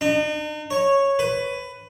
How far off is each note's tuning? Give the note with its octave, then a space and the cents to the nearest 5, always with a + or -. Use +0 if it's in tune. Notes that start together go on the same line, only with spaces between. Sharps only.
D#4 -45
C#5 -5
B4 +15